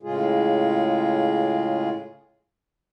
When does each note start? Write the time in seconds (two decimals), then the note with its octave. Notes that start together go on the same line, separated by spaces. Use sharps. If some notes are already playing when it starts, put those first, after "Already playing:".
0.03 A2 C#3 G#3 F4 G#4